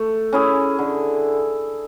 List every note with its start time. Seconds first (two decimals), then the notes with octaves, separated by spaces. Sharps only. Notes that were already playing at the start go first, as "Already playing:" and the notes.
Already playing: A3
0.33 C#4 E4 G#4
0.79 D3